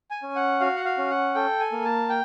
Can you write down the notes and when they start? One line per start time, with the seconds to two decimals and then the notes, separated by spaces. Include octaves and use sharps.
0.11 G#5
0.23 C#4
0.36 F#5
0.60 F#4 F5
0.76 F#5
0.85 F5
0.98 C#4
1.10 F#5
1.35 A4 G5
1.60 G#5
1.72 A#3
1.85 A5
2.09 G5